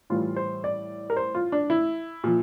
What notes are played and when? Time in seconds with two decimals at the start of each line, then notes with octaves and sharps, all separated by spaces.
0.10 A2 E3 G3 F4
0.36 C5
0.64 D5
1.10 A#4
1.17 C5
1.35 F4
1.52 D4
1.70 E4
2.24 A#2 F3